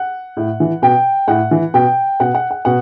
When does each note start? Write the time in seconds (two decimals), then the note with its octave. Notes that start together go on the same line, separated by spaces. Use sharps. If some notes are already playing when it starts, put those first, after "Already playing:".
Already playing: F#5
0.37 A2
0.60 E3
0.82 B2 G5
1.28 A2 F#5
1.51 E3
1.74 B2 G5
2.20 B2 F#5
2.34 F#5
2.51 F#5
2.65 B2 F#5